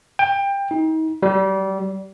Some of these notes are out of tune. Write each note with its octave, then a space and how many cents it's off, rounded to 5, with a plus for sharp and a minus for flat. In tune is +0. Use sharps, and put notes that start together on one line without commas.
G5 +20
D#4 +40
G3 -25